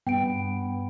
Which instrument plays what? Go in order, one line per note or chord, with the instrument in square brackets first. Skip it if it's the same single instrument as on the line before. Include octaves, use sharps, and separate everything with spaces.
[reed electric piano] G2 [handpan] B3 [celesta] G5 D7